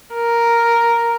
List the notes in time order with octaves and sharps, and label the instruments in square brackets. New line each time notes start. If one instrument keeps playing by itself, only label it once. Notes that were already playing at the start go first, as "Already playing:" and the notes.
[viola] A#4